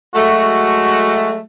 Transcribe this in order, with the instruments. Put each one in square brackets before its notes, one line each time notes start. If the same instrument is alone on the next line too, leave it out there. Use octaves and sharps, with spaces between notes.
[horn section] F#3 G#3 A3 [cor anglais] F#4